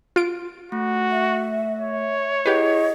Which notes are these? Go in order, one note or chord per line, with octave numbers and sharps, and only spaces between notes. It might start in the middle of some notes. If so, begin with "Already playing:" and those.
F4 D7
A3 F#4
E5
C#5
E4 G4 G#4 B4 D#5 F#5